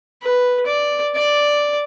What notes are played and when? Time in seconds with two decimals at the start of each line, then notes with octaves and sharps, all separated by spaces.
0.22 B4
0.66 D5
1.15 D5